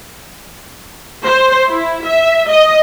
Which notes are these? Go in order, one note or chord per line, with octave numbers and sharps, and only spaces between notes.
C5
E4
E5
D#5